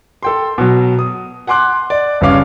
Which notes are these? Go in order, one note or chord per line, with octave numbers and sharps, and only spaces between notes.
A4 G5 C6
B2 F#3
D#6
F#5 G#5 C6 D6 F#6
D5
G1 G2 C#3 C#5 F5 D6